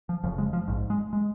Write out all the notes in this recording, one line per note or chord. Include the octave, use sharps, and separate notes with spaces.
F3
F1 F2 C#3 F3
G#3
F3
A#1 G#2
G#3
G#3